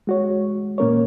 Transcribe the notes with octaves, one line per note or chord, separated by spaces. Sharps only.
G#3 F#4 C#5
A#2 A#3 C#4 A#4 C#5